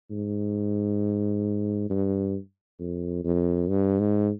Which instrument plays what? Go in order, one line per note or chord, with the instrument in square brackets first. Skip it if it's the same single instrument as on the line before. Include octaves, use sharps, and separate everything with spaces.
[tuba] G#2
G2
F2
F2
G2
G#2